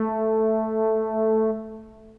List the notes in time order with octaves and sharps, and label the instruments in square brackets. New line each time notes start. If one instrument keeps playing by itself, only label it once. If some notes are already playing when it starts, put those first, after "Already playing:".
Already playing: [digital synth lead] A3